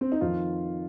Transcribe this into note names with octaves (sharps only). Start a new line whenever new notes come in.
C4
D#4
F2 D#3 F4